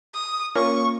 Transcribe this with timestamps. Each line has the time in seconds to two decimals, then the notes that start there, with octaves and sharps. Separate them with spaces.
0.14 D#6
0.55 A#3 C#4 F4 C#6